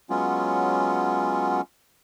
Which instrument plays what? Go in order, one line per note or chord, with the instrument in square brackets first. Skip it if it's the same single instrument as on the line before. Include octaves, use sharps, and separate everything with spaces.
[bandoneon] F#3 G#3 B3 C#4 F4